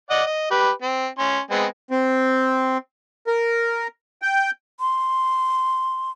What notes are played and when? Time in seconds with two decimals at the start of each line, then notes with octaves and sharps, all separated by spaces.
0.10 D5 D#5 F#5
0.26 D#5
0.51 G4 B4
0.82 C4
1.19 C#4 C6
1.51 G#3 B3 C4
1.91 C4
3.27 A#4
4.22 G5
4.80 C6